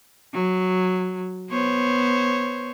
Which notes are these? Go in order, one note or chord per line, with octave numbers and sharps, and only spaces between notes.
F#3
B3 C5 C#5